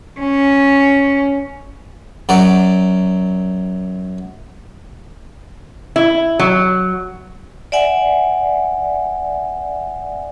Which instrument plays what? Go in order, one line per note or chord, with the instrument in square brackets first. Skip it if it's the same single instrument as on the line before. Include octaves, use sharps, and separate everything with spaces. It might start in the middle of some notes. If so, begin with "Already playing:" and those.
[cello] C#4
[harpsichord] F#2 F#3 D5
[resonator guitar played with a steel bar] E4
F#3
[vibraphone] D5 E5 F#5 G#5